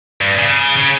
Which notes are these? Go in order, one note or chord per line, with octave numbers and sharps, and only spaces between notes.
G2
C#3
C#3